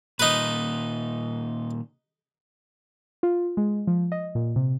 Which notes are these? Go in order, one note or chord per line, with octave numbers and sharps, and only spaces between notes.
A#2 D#3 D#4 B4
F4
G#3
F3
D#5
A#2
C3